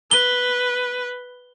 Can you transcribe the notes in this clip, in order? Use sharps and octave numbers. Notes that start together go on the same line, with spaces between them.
B4 G7